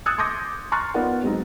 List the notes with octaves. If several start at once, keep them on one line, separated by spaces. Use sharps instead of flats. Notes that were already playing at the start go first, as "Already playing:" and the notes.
D#6 E6 F#6 G#6 A6 C#7
C6 D6 D#6 G6 A#6 C#7
A#5 C6 C#6 F6 F#6 A6
B3 D#4 F4 A#4 D5 F#5
F#3 G#3 C4 D#4